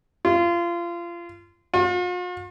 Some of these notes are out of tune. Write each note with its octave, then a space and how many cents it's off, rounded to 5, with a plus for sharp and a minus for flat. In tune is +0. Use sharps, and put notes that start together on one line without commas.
F4 -25
F4 +45